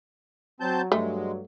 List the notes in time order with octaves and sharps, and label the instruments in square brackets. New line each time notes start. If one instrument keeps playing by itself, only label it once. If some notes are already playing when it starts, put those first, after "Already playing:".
[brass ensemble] F#3 [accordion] C4 A5 G6
[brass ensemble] G2 F#3 [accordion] G#3 [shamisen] A3